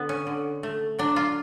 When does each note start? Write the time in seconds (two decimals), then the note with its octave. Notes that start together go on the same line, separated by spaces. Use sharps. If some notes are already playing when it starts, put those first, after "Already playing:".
Already playing: D3 B3
0.09 C#4
0.27 D3
0.63 A3
0.99 F#3 D4
1.16 F4